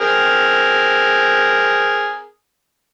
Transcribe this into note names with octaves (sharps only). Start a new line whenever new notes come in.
C4 G#4 A#4